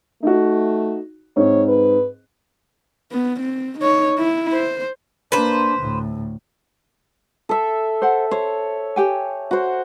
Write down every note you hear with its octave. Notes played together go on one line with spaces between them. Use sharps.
A3 D#4 F#4
G#2 C4 C#5
B4
B3
C4
D#4 C#5
E4
C5
A#3 D4 B4 C5
D2 A2
A4 E5
C5 F#5
C5 C#5
G4 G5 G#5
F#4 C5